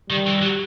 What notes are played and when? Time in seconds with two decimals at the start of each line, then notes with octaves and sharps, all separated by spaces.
0.10 D#3 G3
0.27 E3
0.42 F#3